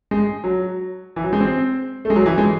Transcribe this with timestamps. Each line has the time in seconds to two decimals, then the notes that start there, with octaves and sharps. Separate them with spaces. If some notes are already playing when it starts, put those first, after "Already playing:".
0.11 G#3
0.44 F#3
1.16 E3
1.24 F#3
1.33 G#3
1.40 C4
2.05 A3
2.10 G#3
2.16 F#3
2.26 E3
2.38 G#3